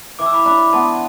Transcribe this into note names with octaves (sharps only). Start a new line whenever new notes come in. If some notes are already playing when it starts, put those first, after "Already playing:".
E3 D6
E6
B5 D6
D4 B5 D6
B3 A5 C6